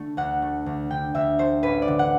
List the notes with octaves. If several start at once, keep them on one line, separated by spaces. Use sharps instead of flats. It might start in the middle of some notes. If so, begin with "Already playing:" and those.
Already playing: D3 A3
D2 F#5
A3
D2
D3 G5
D2 E5
A3 C5
A1 B4
D5
D3
F#5